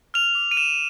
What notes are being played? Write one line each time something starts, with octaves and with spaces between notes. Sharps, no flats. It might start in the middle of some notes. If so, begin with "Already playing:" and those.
F6 F7
D6
D#7
F6 E7